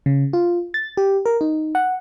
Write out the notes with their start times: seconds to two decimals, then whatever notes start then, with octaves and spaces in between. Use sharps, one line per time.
0.06 C#3
0.33 F4
0.74 A6
0.97 G4
1.26 A#4
1.41 D#4
1.75 F#5